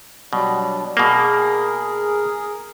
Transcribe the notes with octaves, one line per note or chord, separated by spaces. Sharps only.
B2 F#3 G3 D4
B2 A#3 G#4 A#4